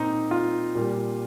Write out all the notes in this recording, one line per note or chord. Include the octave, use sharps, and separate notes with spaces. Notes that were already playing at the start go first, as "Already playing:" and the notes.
Already playing: A#2 C4 D#4
F4
A#2 G3